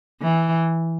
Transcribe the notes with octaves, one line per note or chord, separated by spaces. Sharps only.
E3